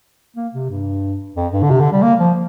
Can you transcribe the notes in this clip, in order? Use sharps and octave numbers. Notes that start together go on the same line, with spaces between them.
A#3
C3
G2
F2
G2
D3
C3
D3
G3
A#3
F3